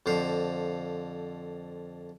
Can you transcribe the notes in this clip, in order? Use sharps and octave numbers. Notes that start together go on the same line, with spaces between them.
F2 D3 C5 F5